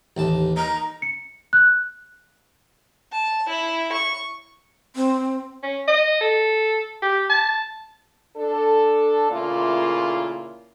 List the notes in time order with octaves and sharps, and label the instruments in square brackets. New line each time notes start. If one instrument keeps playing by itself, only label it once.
[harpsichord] A1 D#2 A5
[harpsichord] D#4 [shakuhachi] A#5
[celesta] C#7
F#6
[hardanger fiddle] A5
E4
C#6
[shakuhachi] C4
[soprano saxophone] C#4
D#5
A4
G4
A5
[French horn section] D4 A4
A#2 C#3 A3 A#3 E4 F4